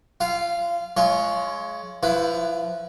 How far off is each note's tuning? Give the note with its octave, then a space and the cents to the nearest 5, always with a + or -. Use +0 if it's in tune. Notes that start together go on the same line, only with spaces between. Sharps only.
F4 -25 F5 +0
G#3 +25 F4 -20 C#5 +5
F3 +0 E4 +25 B4 +0